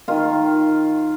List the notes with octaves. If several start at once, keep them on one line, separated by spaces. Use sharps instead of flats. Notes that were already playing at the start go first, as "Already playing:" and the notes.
D#3 F4